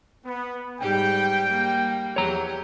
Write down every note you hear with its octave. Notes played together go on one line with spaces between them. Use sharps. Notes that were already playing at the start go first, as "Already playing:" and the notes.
B3
G#2 G3 G4 G5
G3 A#3
E2 G4 C#5 A#5